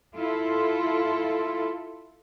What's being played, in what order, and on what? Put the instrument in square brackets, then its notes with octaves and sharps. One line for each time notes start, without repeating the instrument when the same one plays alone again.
[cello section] E4 F4 A4